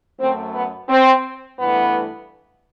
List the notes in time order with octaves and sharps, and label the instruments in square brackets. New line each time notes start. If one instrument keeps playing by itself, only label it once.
[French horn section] F#2 F#3 A3 C4
B3
C4
G2 E3 A3 B3